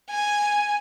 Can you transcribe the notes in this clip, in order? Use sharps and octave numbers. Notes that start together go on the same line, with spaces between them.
G#5